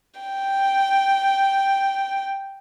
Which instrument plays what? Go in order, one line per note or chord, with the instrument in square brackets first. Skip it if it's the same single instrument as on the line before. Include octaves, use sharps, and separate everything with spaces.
[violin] G5